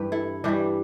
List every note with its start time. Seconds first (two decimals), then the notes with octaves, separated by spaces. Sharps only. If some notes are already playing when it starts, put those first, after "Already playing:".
Already playing: G2 E3 G4 B4
0.12 E4 A4
0.44 G2 E3 G3 D4 G4